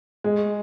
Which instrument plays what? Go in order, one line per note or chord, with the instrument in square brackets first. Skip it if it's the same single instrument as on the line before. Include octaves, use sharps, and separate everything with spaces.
[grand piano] G#3